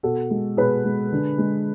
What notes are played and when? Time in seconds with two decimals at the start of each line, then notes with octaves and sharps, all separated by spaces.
0.03 B2 F#4 A4
0.30 G#3
0.57 B2 G#4 B4
0.84 G#3
1.12 D3
1.38 G#3